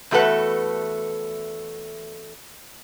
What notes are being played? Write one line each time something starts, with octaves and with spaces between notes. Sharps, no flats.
E2 A3 F#4 A4 B4 F#5